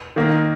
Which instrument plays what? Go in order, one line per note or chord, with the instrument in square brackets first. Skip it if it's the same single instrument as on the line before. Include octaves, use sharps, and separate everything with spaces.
[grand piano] D#3 A#3